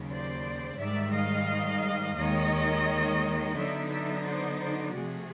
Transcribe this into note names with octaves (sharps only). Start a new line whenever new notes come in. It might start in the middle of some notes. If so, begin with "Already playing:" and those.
Already playing: D#2 C#3 F#3
C5 D5
G#2 D#3 G3 D5 E5
D#5 F5
D#2 D#3 G#3 C#5 D#5
D3 F#3 B3 D#4 D5 E5
D5 E5
C5 D5
C5 D5
C3 F3 A3 F#4 G#4